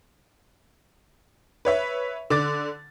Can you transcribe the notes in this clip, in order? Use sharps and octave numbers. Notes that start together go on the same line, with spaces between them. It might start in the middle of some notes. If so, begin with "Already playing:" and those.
B4 C#5 E5
D3 D6 A6